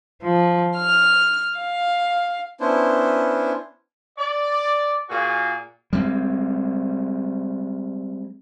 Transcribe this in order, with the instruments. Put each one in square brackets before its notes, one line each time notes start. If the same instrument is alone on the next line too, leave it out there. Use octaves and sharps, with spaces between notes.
[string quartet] F3
F6
F5
[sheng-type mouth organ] B3 C#4 D4 E4 C5
[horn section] D5
A#2 F#4 G#4
[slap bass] G3 G#3 C4